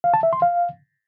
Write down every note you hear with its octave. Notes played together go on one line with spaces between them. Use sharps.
F5
A5
E5
C6
F5